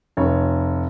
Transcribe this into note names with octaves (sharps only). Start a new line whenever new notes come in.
F1 C#5